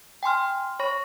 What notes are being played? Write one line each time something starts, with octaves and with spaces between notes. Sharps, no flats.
G5 G#5 C6 F6
C#5 B5 C#6 A#6